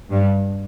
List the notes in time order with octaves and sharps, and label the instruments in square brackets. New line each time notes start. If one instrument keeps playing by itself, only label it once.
[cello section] G2